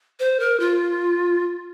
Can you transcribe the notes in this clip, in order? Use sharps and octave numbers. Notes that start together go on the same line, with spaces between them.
C5
A#4
F4